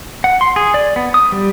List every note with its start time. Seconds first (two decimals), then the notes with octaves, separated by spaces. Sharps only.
0.24 F#5
0.41 C6
0.56 G#4
0.74 D5
0.96 B3
1.14 D#6
1.32 G3